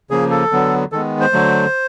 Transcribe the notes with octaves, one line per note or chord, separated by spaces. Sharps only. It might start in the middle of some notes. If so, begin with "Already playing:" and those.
C#3 F3 A#3 G#4
A4
D3 F#3 B3
D#3 G#3 B3 A4
C5
D3 F#3 A3